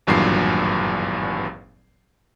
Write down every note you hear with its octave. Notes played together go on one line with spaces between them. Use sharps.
G#1 E2 G2 A#2 F#3 C7